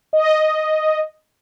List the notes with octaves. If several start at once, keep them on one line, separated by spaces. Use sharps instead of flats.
D#5